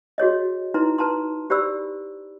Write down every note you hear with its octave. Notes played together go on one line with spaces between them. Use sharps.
F#4 G#4 C#5 D#5
D#4 E4 B4 A#5 C6
B4 A5 A#5 C6
G4 C5 D5 B5 E6